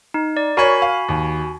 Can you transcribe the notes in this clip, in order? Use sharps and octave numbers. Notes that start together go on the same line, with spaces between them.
D#4
D5
F#4 A#4 C#5 G#5 B5
F5
D#2